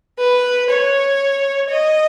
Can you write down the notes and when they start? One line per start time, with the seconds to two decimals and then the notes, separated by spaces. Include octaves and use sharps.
0.18 B4
0.69 C#5
1.70 D#5